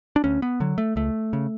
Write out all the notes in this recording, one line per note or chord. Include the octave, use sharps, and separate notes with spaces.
D4
D2 C#4
B3
D3 F#3
A3
C#2 A3
C#3